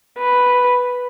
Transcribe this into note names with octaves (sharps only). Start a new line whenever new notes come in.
B4